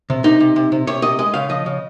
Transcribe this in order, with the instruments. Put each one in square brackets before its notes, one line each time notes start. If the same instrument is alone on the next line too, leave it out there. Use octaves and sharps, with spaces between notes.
[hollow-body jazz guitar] C3
C3 D#4
C3
C3
C3
C3 C#5
C3 D#5
G#3 D#5
C#3 F5
F3 D#5
C#3